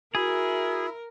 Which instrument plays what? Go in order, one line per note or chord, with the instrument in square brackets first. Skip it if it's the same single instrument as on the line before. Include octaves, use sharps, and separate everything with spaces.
[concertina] E4 E5 [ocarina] F#4 [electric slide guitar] G#4 [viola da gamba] A#4